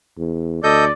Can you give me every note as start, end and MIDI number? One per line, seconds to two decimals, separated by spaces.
0.18 0.63 40
0.64 0.89 38
0.64 0.85 69
0.64 0.93 74
0.64 0.85 75
0.64 0.85 91